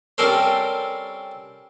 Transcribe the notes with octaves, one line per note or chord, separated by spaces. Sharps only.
G3 C4 C#4 A4 A#4 C5